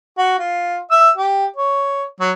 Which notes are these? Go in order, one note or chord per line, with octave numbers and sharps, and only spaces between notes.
F#4
F4
E5 E6
G4
C#5
F#3